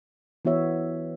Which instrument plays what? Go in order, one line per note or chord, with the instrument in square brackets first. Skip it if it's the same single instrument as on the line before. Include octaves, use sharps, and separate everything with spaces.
[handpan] E3 B3 F#4 C#5 E5